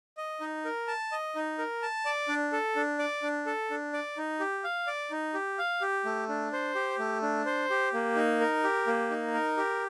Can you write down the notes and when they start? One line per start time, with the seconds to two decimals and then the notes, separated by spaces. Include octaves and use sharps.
0.17 D#5
0.40 D#4
0.65 A#4
0.88 A5
1.12 D#5
1.35 D#4
1.58 A#4
1.82 A5
2.05 D5
2.28 D4
2.53 A4
2.76 D4
2.99 D5
3.23 D4
3.46 A4
3.71 D4
3.93 D5
4.17 D#4
4.40 G4
4.64 F5
4.87 D5
5.11 D#4
5.34 G4
5.58 F5
5.81 G4
6.05 A3
6.29 D4
6.53 C5
6.75 G4
6.99 A3
7.22 D4
7.46 C5
7.70 G4
7.94 A#3
8.16 D#4
8.41 A#4
8.64 G4
8.87 A#3
9.10 D#4
9.34 A#4
9.57 G4